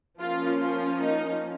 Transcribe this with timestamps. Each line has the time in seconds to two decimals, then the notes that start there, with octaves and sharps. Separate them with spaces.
0.20 F3 A#3 C#4 F4
0.60 F4
1.00 D#4